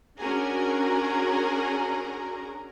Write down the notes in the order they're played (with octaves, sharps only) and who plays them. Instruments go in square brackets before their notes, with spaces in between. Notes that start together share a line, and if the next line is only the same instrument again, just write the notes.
[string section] C#4 D4 F#4 G#4 A#4 A#5